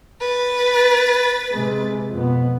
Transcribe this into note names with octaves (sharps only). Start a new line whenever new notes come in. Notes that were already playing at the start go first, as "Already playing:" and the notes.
B4 A6
C3 G#3
F2 B2 B3